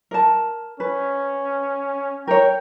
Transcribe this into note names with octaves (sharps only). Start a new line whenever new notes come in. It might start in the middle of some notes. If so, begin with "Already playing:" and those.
A#4 A5
C#4 B4
A#4 C#5 G5